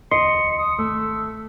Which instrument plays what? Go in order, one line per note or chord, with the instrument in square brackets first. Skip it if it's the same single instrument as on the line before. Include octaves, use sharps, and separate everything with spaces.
[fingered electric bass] E1 D2 [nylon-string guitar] D#5 [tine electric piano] C6 [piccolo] C#7
[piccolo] D#6
[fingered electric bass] G#1 [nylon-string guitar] A3 [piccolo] E6